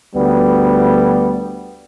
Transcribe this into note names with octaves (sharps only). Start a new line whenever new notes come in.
D2 G3 B3